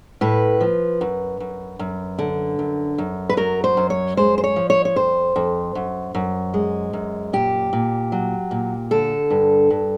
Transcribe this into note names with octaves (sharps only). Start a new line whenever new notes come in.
A2 B4
F3
F#2
F#2
F#2
D3
F#2
F#2
B4
F#3 A#4
C5
F#2
C#5
G#3 C5
C5
C#5
F3
C#5
C#5
F2 C5
F2
F#2
F#2
G#3
F#2
A#2 G4
A#2
F#3
A#2
D3 A4
G2
G2